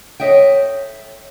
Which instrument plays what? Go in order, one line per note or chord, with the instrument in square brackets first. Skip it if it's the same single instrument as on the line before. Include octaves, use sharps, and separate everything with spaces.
[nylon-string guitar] A4 C#5 D#5 E5 G5